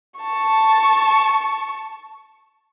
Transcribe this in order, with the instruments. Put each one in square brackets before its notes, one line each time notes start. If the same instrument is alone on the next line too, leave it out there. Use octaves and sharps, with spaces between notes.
[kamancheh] A5 C#6